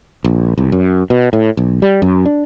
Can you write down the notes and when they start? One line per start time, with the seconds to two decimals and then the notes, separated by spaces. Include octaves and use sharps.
0.24 A#1
0.58 C2
0.72 F#2
1.10 B2
1.33 A2
1.57 B1
1.82 G3
2.02 F#2
2.26 D4